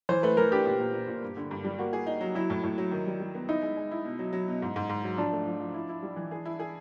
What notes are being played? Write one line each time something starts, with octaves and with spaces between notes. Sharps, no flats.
E3 C5
A3 B4
E3 A#4
D4 G4
A#2 G4
A#2
A#2
A#2
G2
D3
G2
G3
A#3 F#4
G#4
D#4
F#3
F#3 E4
A2
A2
F#3
D#3
G3
G3
B3
D#4 E4
G#3
G#3
E4
B2
F#3
F#3
B2
G#2
G#2
G#2
F#3
F3 D4
A3
F3
F3
E4
E4
G3
E3
G#4
E4
G#4